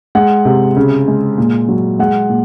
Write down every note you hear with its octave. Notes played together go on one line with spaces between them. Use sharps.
G#3 F#5
C3
C#3
G#3
A#2
F#3
G#3 F#5
A#2